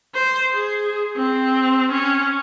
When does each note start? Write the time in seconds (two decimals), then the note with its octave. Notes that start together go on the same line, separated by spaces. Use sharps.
0.15 C5
0.50 G#4
1.17 C4
1.92 C#4